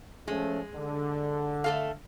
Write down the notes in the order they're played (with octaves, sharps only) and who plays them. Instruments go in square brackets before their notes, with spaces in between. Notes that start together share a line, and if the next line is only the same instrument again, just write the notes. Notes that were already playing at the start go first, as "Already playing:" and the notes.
[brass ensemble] F3 A3 C#4 [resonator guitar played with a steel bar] G#3
[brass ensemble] D3
[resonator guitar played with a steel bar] A3 A4 F5